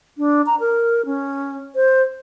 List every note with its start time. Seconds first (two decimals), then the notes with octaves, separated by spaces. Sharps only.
0.18 D4
0.46 A#5
0.60 A#4
1.05 C#4
1.75 C5